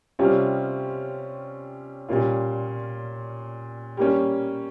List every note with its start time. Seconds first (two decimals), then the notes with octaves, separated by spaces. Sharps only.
0.19 C3 G3 C#4 F4
2.09 A#2 G3 A#3 C#4 F4
3.97 G3 A#3 C#4